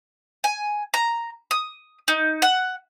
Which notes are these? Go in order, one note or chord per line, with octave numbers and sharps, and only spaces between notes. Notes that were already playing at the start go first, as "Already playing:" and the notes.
G#5
A#5
D#6
D#4
F#5